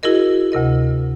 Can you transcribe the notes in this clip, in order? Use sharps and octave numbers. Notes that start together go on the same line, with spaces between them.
E4 F#4 G#4 A#4 D#5
D2 C3 A#4 D#5